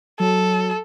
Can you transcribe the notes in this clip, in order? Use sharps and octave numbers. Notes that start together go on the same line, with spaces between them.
F#3 A4